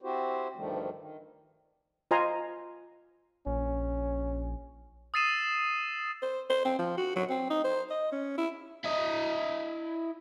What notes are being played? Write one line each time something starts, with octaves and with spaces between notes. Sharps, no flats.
C4 E4 F#4 G4 C5
D2 G2 D#3 F3 G3 A3
D#3
F4 C5 D#5 G#5 A#5 C6
A#1 C#4
D#6 E6 A6 C7 D#7 E7
C5
C5
C4
F3
F#4
F#3
C4
D#4
C5
D#5
C#4
E4
E4 D#5